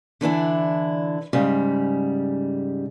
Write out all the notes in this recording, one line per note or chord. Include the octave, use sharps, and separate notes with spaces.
D3 E3 D4 E4
G#2 C#3 G3